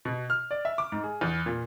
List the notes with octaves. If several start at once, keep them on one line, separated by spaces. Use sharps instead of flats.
B2
F6
D5
E5
D6
G#2
G#4
E2
A#2